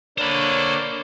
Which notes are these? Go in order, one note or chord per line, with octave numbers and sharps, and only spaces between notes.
D3 A#3 D4 C5 C#5 B5